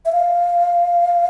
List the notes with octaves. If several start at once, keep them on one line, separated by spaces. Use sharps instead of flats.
E5
F5